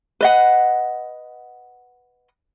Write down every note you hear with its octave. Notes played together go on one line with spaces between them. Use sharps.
B4 D#5 F#5